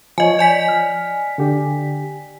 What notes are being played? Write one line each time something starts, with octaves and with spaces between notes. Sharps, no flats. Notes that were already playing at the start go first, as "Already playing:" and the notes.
F3 C#5 D#5 G#5
D5 G#5 B6
F6
D3 G4